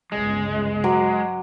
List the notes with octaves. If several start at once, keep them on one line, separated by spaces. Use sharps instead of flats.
G1 C#2 G#3
F#3 C6 D6